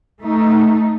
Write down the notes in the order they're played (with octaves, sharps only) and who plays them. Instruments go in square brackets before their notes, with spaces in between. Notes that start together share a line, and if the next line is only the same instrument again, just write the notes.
[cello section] A3 D#4